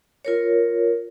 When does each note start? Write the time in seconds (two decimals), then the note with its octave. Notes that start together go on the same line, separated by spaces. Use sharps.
0.25 F4 A#4 C#5